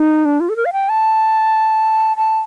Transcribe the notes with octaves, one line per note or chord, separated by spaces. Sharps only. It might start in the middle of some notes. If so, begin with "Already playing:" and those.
Already playing: D#4
D4
F4
A4
A#4
F5
G5
A5
A5